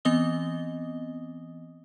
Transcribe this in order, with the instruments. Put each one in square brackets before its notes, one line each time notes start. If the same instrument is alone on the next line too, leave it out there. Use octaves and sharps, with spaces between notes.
[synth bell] E3 B3 C4 D#5 D#6 G7